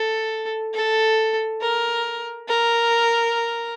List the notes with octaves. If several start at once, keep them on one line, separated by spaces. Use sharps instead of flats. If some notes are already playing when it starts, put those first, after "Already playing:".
Already playing: A4
A4
A#4
A#4